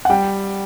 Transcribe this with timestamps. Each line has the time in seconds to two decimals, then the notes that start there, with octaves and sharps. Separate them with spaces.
0.05 F#5
0.10 G3 G5